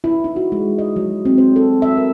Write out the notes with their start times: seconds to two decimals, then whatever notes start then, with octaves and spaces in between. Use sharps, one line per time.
0.04 E4
0.24 D#4
0.36 F#4
0.52 G#3
0.78 D#5
0.96 F#3
1.25 C4
1.38 C5
1.56 A4
1.82 E5
1.97 A#4